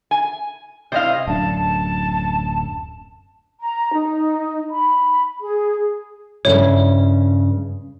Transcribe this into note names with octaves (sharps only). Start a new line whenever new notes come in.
G#5
C3 E4 C5 D#5 F5
D1 F#2 D4 A5
A#5
D#4
B5
G#4
G2 C#3 E4 C#5